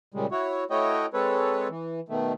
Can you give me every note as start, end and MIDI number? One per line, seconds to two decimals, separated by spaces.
0.14 0.26 46
0.14 0.26 49
0.14 0.26 55
0.14 0.26 56
0.31 0.64 64
0.31 0.64 66
0.31 0.64 73
0.70 1.06 57
0.70 1.06 64
0.70 1.06 66
0.70 1.06 73
0.70 1.06 75
0.70 1.06 79
1.14 1.68 56
1.14 1.68 60
1.14 1.68 69
1.14 1.68 71
1.14 1.68 73
1.69 2.00 52
2.09 2.33 47
2.09 2.33 51
2.09 2.33 57